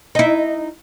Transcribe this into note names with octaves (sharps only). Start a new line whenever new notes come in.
D#4 E4